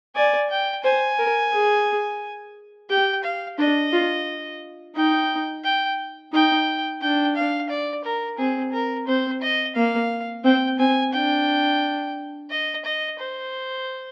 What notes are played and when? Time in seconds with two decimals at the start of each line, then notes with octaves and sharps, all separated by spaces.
0.15 D5 G#5
0.50 G5
0.84 C5 G#5
1.19 A#4
1.53 G#4
2.90 G4 G5
3.24 F5
3.59 D4 D#5
3.93 F4
4.96 D#4 G5
5.64 G5
6.33 D#4 G5
7.01 D4 G5
7.36 F5
7.70 D5
8.04 A#4
8.38 C4 G#4
8.73 A#4
9.08 C4 C5
9.42 D#5
9.76 A#3 F5
10.44 C4 G5
10.79 C4 G#5
11.13 D4 G5
12.50 D#5
12.85 D#5
13.19 C5